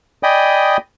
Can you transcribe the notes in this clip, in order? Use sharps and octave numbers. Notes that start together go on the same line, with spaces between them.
D5 D#5 G5 G#5 B5 D#6